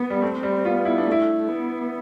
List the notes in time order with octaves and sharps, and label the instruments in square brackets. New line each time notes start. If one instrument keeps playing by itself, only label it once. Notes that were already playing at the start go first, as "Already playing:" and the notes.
Already playing: [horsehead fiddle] B3
[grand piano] G3
[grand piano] A3 [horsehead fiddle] C4
[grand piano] G3
[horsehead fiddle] B3 [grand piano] F4
[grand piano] E4
D4
[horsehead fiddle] A3 [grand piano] E4
[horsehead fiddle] B3